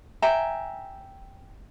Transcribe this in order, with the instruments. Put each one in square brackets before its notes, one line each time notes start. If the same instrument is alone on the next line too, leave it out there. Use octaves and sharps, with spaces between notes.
[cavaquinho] E5 G5 G#5 A#5